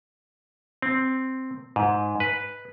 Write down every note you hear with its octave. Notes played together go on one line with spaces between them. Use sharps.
C4
G#2
B4